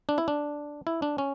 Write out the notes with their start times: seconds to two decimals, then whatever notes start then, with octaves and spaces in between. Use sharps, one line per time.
0.09 D4
0.18 E4
0.28 D4
0.87 E4
1.02 D4
1.18 C#4